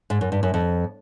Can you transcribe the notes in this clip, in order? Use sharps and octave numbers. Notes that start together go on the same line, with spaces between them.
G#2
F#2
G2
F#2
F2